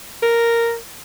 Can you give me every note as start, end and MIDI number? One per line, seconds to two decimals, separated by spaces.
0.22 0.77 70